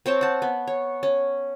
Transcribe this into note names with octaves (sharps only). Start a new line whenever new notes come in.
C4 C#5 G5 A5
F#5 A5
B3
C#5
C#4